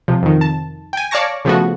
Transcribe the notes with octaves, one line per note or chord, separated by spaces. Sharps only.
C3 F3
F2 D#3
A5
G5 G#5
C#5 D5 F5 A5 C#6 A#6
C#3 F3 A3 B3 F#4